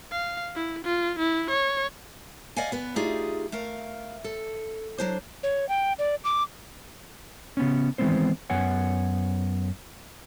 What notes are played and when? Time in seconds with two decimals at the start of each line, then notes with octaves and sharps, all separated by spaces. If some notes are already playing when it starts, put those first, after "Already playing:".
0.11 F5
0.55 E4
0.84 F4
1.19 E4
1.50 C#5
2.56 D5 D#5 F5 F#5 G#5
2.72 B3 B4
2.96 A3 D#4 F4 G4 G#4 D5
3.52 A3 A#4 F5
4.24 A4
4.98 F#3 D4 C5
5.43 C#5
5.69 G5
5.99 D5
6.24 D6
7.57 C#3 B3 C#4
7.98 D#3 E3 G#3 B3 C4 C5
8.50 F#2 B3 C#5 F#5 G#5